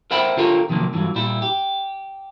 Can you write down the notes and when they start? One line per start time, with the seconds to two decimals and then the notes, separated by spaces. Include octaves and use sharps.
0.11 A#4 C5 E5 F#5 G5 B5
0.37 D3 F4 G4 A4 A#4 C#5
0.69 C3 D#3 F3 F#3 A#3
0.93 G2 E3 F#3
1.15 A#2 G3 E4 E5
1.42 G4